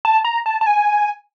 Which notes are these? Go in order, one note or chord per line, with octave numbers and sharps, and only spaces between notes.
A5
A#5
A5
A5
G#5